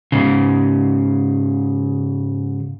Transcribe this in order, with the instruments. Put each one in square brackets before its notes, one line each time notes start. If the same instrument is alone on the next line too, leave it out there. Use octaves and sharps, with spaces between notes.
[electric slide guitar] G#2 C#3